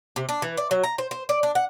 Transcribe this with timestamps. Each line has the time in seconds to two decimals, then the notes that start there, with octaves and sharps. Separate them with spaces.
0.16 C3
0.29 D4
0.42 E3
0.57 D5
0.71 F#3
0.84 A#5
0.98 C5
1.11 C5
1.29 D5
1.43 D4
1.55 F#5